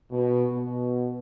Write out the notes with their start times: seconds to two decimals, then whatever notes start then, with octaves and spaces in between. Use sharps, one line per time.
0.11 B2
0.52 B2